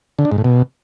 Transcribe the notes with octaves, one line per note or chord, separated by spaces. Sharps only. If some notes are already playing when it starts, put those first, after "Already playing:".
D3
D4
G#2
A2
B2